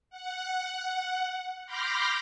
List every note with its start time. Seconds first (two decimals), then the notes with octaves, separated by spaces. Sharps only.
0.10 F#5
1.66 B5 C6 D6 F6 G6 A#6